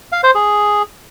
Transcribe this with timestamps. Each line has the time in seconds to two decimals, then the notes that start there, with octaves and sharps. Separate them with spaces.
0.12 F5
0.23 C5
0.35 G#4